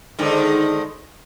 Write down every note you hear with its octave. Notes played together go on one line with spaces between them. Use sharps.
G#2 D3 D#3